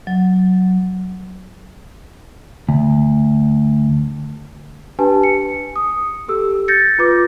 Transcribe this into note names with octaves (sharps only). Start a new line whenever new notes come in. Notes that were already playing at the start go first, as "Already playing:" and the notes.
F#3
D2
D4 G4 B4 G#5 A5
C#7
D#6
G4 A4 E6
G6 A6 A#6 C#7
F4 B4 D6